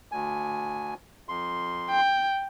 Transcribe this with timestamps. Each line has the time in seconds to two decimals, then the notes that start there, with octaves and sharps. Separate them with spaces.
0.12 D2 G#5
1.29 F2 C6
1.91 G5